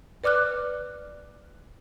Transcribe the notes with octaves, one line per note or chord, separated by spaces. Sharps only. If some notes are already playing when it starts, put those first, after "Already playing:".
B4 D5 D6 F6 F#6